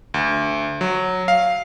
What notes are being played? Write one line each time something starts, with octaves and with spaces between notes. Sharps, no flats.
D2
F#3
F5